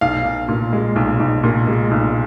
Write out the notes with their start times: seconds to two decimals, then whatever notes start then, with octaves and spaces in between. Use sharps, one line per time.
0.01 B1 F5
0.25 B1
0.48 A#2
0.73 G#3
0.96 B1
1.19 B1
1.43 A#2
1.67 G#3
1.91 B1